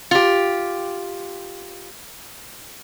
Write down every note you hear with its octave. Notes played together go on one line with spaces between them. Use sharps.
F4 G4